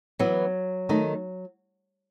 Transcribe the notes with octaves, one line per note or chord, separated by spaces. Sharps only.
E3 F#3 B3 E4
D#3 A3 D#4